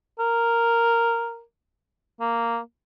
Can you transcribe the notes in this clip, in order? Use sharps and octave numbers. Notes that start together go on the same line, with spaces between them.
A#4
A#3